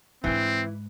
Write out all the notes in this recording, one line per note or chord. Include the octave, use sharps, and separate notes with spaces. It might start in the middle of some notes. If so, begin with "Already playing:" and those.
G#2 E3 G#3 C4